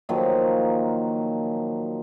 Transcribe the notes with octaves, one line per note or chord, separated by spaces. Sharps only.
A#2 D#3 F3 F#3